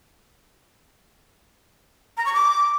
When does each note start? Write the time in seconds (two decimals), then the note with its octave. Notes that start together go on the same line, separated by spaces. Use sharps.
2.17 A#5
2.25 C#6
2.33 D6